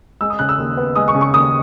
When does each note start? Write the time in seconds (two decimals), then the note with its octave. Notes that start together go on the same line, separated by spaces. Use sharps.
0.21 G#3 E6
0.30 D#6
0.39 C#3 F#6
0.49 E6
0.58 D#2
0.77 B3
0.96 G#3 D#6
1.08 C#6
1.15 C#3
1.21 C#6
1.33 D#2 D#6